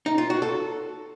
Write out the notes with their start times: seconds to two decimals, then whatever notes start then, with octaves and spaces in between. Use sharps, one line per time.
0.06 D#4
0.18 F4
0.30 F#4
0.42 A4